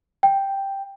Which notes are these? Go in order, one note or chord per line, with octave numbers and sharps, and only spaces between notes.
G5